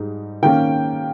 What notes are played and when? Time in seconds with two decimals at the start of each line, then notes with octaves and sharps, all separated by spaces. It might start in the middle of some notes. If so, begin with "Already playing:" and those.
Already playing: G#2 G3 D#4
0.42 D#3 A#3 C#4 G5